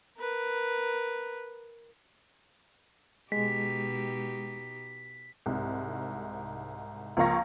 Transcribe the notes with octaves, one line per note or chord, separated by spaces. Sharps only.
A#4 B4
B2 G#3 D#4 G4 B6
C2 G#2
C#2 F3 A#3 F5 C#6 A#6